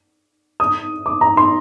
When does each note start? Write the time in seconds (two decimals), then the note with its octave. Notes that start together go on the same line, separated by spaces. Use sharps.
0.60 D#6
1.06 D6
1.21 A#5
1.37 C6